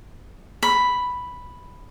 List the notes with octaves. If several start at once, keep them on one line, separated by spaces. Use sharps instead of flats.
B5